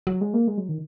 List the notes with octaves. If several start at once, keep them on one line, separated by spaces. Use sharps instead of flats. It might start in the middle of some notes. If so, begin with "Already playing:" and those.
F#3
G#3
A#3
G#3
F#3
D#3